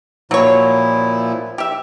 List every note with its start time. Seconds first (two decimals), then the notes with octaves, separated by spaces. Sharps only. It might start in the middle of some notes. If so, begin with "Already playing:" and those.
0.31 A#2 F3 F#3 E4 C#5
1.58 G4 E5